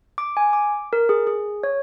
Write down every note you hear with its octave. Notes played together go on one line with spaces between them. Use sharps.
D6
G#5
D6
A#4
G#4
G#4
C#5